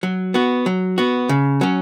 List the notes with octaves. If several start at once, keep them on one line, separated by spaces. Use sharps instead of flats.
F#3
B3 F#4
F#3
B3 F#4
C#3
F#3 C#4